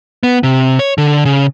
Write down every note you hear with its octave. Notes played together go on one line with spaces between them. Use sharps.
B3
C3
C#5
D3
C#3